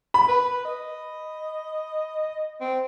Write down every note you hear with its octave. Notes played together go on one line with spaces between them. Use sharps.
B5
B4
D#5
C4